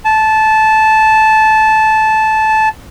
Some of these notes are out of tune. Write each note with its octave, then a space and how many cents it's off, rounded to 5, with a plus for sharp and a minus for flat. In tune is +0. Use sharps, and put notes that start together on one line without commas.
A5 -15